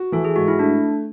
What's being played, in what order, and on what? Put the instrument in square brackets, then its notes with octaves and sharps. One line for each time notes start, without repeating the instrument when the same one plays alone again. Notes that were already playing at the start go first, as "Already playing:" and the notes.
Already playing: [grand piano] F#4
[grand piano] E3 [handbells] A4
[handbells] G#4
[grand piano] G#2 [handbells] F#4
[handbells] E4
[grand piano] A3 [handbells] D4